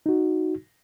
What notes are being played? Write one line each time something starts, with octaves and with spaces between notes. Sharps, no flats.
D#4 F#4